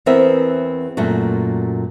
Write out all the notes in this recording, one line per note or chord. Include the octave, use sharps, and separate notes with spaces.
E2 B3 C4 A#4 B4 E5
F#2 A#2 A3 F#4